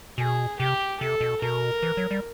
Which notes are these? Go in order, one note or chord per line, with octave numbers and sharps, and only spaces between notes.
B2 G#4
C3 G4
C3 A4
B2
B2 A#4
E3
F#3
G3